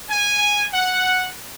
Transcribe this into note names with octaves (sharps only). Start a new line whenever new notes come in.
G#5
F#5